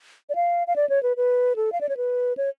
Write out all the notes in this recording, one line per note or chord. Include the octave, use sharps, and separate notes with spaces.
D5
F5
F5
D5
C#5
B4
B4
A4
F5
D5
C#5
B4
C#5